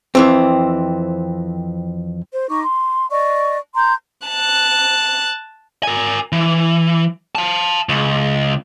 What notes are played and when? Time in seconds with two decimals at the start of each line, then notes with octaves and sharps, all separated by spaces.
0.15 F2 E3 C4
2.33 C5
2.50 D#4 C#6 D6
2.63 C6
3.11 D5 D#5 C#6
3.75 A#5 C6 G6
4.28 A5 F#6
5.83 A#4 G#5
6.32 E3
7.35 F5 A5
7.89 C#2